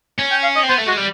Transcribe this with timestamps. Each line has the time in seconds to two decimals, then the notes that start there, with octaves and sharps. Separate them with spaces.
0.19 C#4
0.31 G5
0.43 F5
0.56 D#5
0.63 C4
0.69 B3 C5
0.78 A3
0.87 G#3 F#4
0.97 G3